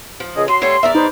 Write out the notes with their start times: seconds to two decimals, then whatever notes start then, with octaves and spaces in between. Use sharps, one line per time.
0.20 F3
0.35 C#2 G#4 D#5
0.48 F#3 C6
0.62 G3 A3 C#5
0.83 E2 A#4 D5 E5
0.95 D#4 B4 C5